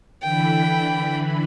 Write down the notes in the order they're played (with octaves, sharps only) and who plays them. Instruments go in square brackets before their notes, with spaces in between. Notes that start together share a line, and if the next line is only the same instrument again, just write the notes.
[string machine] D3 E3 B5 [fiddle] G5